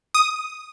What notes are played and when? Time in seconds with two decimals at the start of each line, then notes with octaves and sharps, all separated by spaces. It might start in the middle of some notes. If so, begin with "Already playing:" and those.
0.14 D#6